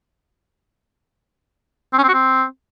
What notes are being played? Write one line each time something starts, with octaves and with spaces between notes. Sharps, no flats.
C4
C#4
C4
F#4
C4